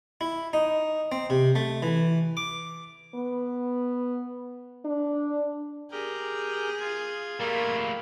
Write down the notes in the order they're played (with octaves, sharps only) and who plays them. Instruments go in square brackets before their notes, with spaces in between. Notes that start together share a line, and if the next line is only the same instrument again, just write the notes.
[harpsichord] E4
D#4
C4
C3
A3
E3
D6
[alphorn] B3
D4
[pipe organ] G4 A#4 G5 [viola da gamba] G#4
[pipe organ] F4 G#6
[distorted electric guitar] G3 A3 [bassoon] A#3